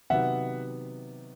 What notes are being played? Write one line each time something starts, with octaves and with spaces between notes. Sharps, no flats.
C3 D#3 F#3 B3 E5 F#5